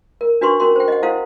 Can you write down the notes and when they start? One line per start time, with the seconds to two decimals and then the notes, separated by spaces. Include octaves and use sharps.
0.21 A#4
0.41 D4 F#4 B4 C6 C#6
0.60 C#4 F#4 A#4 C6
0.76 C5 G5
0.88 D#5 F#5
1.03 E4 A4 C5 F5 F#5